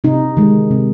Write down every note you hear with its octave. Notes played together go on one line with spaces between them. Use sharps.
C3 D#4
D#3 G#3
C3